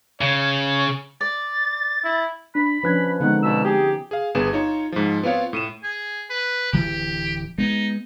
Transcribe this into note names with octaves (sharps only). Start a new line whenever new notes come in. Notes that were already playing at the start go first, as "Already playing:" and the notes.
C#3 C#5
D5 A6
E4
D4 B5
F3 C#4 D4 B4 F#6 G#6
D3 D#3 G#3 B3 C4 D#4 F#5
G2 B2 E6
G4 G#4
G#4 F5
G1 B3 G#4 E7
D#4 F4 C#5
G#2 F3
B3 C4 F4 C#5 F5
A2 D#7 E7
G#4
B4
D1 E3 G4
G#3 B3 D#4